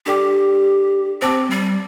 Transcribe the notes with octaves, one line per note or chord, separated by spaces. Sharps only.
D4 G4 A4 D5 G5 D6
C4 C5 A5 D6
G3